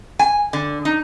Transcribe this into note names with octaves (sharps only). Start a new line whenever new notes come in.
G#5
D3
D#4